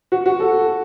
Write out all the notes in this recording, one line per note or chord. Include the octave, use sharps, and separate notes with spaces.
F#4
F#4
A4